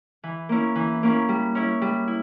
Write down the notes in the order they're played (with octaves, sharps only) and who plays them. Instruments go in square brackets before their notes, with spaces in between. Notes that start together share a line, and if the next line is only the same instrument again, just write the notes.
[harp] E3
A#3 C#4 E4
E3
A#3 C#4 E4
G3
C#4 E4
G3
E4